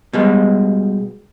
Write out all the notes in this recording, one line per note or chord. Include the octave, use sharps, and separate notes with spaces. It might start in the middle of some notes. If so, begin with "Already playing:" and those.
B2 G3 G#3